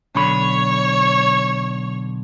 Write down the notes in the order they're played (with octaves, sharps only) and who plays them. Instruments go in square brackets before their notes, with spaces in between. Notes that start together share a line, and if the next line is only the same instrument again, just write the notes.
[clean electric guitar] B1 D3 B5 [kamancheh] C#5 C#6